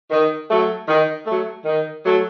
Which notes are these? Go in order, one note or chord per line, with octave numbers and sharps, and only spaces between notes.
D#3
F#3 A3
D#3
F#3 A3
D#3
F#3 A3